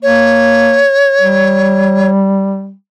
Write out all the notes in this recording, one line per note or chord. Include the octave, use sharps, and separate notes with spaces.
A#3 C#5
G3